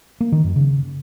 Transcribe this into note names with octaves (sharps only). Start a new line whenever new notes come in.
A#3
D#3
F#2
C#3